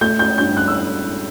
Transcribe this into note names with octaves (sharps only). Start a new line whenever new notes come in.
A3 G6
G6
G2 G6
F#6
E6